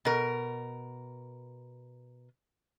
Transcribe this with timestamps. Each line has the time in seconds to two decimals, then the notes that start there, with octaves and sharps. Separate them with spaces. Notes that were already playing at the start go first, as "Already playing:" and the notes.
0.05 B2 A#4